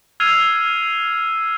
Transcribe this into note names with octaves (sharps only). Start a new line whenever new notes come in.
E6 F6 G#6 C7 D#7 F7